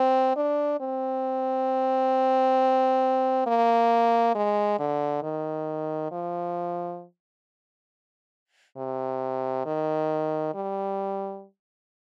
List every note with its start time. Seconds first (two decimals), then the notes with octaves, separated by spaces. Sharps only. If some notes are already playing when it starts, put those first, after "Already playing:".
Already playing: C4
0.36 D4
0.80 C4
3.46 A#3
4.35 G#3
4.79 D3
5.23 D#3
6.12 F3
8.77 C3
9.66 D#3
10.54 G3